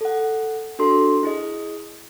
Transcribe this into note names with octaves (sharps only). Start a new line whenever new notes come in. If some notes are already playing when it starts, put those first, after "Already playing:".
A4 F#5
D4 F#4 A4 C6
E4 G#4 D#5